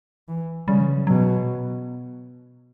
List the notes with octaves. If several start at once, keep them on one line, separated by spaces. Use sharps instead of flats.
E3
C#3 G3
E3
F#3
B2 F#3